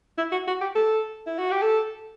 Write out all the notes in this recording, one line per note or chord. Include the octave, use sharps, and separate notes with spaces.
E4
F#4
F#4
G4
A4
E4
F#4
G4
A4